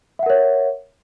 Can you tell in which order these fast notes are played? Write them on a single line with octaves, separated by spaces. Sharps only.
E5 F#5 A#4 C#5